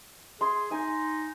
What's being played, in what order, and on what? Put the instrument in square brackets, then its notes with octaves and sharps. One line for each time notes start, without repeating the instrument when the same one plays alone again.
[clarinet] G#4 [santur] C6
[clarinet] D#4 [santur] G#5